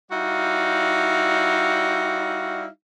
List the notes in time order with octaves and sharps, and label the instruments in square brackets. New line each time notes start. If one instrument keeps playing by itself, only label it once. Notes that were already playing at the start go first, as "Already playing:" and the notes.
[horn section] G3 D#4 E4 F#4 D5 F5